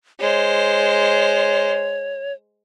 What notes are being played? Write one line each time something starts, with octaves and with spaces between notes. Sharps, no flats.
G#3 C5 C#5